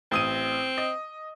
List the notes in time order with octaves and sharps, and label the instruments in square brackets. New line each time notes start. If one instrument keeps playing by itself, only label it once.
[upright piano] A1 D#6 D#7 [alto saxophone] C4
[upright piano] D#5